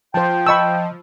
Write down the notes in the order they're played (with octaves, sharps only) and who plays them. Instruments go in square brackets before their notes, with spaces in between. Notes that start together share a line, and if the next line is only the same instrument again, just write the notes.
[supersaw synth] F3 [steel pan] C5 A5 [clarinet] G5
[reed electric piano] D#5 A5 [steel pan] B5 C#6 E6